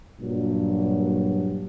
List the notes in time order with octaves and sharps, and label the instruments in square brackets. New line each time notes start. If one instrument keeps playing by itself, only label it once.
[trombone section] G2 A#2 F#3